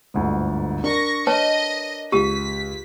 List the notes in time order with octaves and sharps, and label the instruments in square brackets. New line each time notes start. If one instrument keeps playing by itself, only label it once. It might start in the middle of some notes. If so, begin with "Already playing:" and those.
[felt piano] G1 D2 G#2
[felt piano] D4 A#4 D5 [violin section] C#6 A#6
[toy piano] B4 C#5 A5 [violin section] D#5
[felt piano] C#2 D#7 [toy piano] G4 [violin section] B6